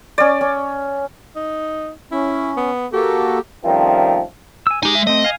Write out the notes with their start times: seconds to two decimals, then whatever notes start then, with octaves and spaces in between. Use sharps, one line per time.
0.18 C#4 D5
0.41 C#4
1.36 D#4
2.12 C#4 E4
2.57 B3
2.93 A#3 F#4 G4 A4
3.65 D#3 F3 G3 A3 C4 C#4
4.67 G#5 E6
4.83 G#3 D#4 G4 G#4 G#5
4.95 E5
5.07 A3 C4 D#5
5.24 F5 G#5